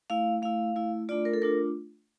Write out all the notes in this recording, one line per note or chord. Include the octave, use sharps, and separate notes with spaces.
A3 E4 F5
A3 E4 F5
A3 E4
A3 D4 F4 D5
A#4
A4
A3 D4 F4 A#4